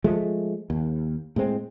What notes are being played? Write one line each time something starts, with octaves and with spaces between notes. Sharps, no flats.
F3 G#3 A3
D#2
A2 G#3 C4